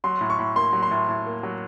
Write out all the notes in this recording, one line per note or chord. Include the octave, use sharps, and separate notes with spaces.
F#3 C6
A2
C#6
A2
A#3 C6
F#3
C6
A2
A2
A#3
F#3